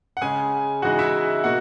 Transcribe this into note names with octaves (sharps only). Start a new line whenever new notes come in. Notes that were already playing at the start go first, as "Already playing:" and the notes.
F#5
C#3 G#3 C#4 G#4 G#5
C#3 E3 G#3 D#4 F#4 F#5
E4 E5
B2 A#3 F#4 F#5